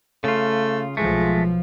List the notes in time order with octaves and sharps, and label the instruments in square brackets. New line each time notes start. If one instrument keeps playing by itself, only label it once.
[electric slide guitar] C#3 F4 [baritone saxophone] A3
[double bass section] B1 F3 [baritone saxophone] G#3 [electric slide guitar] A3